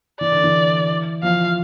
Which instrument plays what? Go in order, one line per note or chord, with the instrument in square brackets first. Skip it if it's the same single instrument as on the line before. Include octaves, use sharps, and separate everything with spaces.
[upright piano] E3 [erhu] D5
[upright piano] D3
E3
[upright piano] F3 [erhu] F5